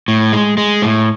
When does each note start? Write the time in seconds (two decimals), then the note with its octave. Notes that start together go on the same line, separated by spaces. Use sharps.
0.08 A2
0.33 G#3
0.58 G#3
0.82 A2